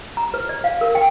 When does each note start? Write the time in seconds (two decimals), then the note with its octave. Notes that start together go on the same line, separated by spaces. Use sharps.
0.17 A#5
0.34 B4
0.49 D5
0.64 F5
0.81 A#4
0.95 G5